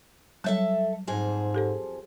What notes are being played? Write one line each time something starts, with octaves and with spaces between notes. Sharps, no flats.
F#3 G3 A4 C#5 E5 A5
F2 G#2 F3 G#4
G4 A4 C5